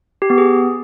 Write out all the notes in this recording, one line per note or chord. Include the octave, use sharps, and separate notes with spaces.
G4
B3
G#4